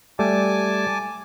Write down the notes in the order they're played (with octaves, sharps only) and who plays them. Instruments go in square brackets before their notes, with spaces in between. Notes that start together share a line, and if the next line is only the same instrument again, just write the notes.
[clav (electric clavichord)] G3 A3 [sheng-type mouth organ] G#5 A5 D6